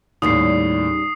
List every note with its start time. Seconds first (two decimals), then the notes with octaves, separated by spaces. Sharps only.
0.22 D#2 A2 C#3 G3 B3 D#4 D#6 C7